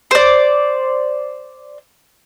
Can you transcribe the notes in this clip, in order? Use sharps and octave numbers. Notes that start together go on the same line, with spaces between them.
C5 D5